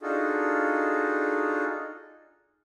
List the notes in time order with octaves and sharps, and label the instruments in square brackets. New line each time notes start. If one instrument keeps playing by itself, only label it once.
[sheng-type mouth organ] D4 D#4 F4 F#4 G#4 A4